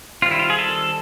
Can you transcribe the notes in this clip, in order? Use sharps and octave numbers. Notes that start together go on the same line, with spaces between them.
D#3 G3 C4 F4
E4
F4
G#4
A4